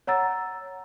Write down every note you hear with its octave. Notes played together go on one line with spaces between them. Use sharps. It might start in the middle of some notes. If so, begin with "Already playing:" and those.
C#5 F#5 A#5 E6 A6